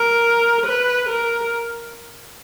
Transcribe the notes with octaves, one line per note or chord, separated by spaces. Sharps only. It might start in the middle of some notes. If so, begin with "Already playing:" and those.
Already playing: A#4
B4
A#4